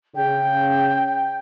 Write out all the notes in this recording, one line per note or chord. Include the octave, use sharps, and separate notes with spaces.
C#3 C#4 G#4 G5